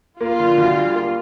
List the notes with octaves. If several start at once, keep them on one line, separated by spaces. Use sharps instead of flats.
A#3 F4
D3
D2
G3
A#3